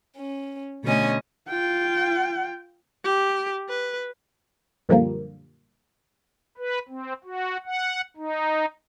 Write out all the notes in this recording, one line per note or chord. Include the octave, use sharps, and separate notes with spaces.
C#4
B2 D3 A3 C#4 D#5 G#5
F4 G5
G4
B4
F#2 A#2 D3 F3 G3 A#3
B4
C4
F#4
F#5
D#4